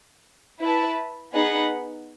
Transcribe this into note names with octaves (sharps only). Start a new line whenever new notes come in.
E4 B4 E5 A5
B3 D#4 G#4 B4 F#5